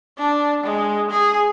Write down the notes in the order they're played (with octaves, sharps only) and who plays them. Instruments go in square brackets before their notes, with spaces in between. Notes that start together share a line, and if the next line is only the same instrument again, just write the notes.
[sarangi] D4
G#3
G#4